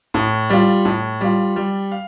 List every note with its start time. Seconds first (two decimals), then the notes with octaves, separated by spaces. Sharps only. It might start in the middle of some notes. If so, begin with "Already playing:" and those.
0.14 A2
0.50 G3 F4
0.85 A2
1.21 G3 F4
1.56 G3
1.92 F5